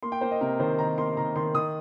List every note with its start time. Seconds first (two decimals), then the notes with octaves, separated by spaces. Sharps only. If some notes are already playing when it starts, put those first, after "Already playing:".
0.03 A#3 C6
0.12 G5
0.21 A#3 C5
0.31 D#5
0.41 C3 A#4
0.60 D#3 C5
0.79 D#3 A#5
0.98 A#3 C6
1.17 D#3 A#5
1.36 D#3 C6
1.55 D#3 D#6